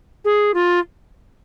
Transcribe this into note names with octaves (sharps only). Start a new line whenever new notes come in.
G#4
F4